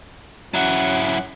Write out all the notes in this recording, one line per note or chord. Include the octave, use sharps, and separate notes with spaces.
F#3 C#4 E4 F#5